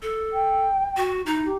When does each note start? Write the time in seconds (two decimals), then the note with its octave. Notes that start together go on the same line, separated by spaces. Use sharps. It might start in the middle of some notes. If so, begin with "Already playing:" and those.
0.02 A4
0.32 G5
0.97 F#4
1.26 D#4 E4
1.44 G4